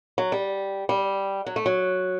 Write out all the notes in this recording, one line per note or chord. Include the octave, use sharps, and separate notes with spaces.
F#3
G3
G3
F#3
A3
F#3